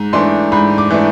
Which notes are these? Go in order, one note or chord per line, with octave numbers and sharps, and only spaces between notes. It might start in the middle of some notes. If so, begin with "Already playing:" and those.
Already playing: G#2
E3 A3 D4 C6
G#2 B5
D6
E3 A3 D4